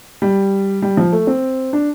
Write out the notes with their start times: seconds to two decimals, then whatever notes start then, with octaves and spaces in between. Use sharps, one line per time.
0.22 G3
0.82 G3
0.97 F3
1.12 A3
1.27 C4
1.73 D4